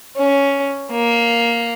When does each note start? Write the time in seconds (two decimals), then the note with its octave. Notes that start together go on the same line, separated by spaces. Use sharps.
0.16 C#4
0.91 A#3